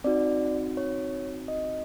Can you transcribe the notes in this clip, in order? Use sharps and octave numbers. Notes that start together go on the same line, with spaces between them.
C4 D#4 F#4 D5
C#5
D#5